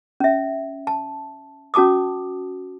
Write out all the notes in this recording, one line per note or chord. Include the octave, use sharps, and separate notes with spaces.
C#4 E5
A5
C#4 F#4 A5 D6 D#6